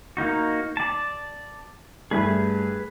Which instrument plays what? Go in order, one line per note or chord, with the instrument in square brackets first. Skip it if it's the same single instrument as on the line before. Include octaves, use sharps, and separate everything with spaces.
[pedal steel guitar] A#3 D#4 F#4
D5 A5
[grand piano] G2 A3 [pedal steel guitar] G#4 B4